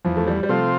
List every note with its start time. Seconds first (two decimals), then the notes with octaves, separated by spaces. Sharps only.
0.05 E2 F3
0.17 A3
0.27 G3
0.43 G3
0.49 C3 F3 A3 C4 F4